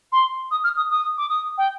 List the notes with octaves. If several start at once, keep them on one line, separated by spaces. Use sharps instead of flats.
C6
D#6
F6
D#6
D#6
D6
D#6
G5